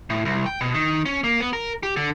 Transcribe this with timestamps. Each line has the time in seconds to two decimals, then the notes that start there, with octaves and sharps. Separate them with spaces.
0.10 A2
0.25 C2
0.46 G5
0.61 B2
0.74 D#3
1.05 C#4
1.24 A#3
1.40 B3
1.53 A#4
1.83 G4
1.96 D3